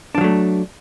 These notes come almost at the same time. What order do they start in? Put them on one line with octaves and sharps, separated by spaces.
D4 F3 F#3 A3